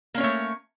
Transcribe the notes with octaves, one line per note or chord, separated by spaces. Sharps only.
A3 A#3 C#4 C#5